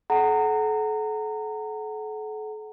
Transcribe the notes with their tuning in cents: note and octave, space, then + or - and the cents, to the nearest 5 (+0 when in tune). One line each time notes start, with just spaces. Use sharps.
A4 -40 F#5 +15 A#5 -25